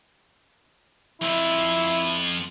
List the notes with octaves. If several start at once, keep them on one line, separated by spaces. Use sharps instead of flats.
F2 E4 F4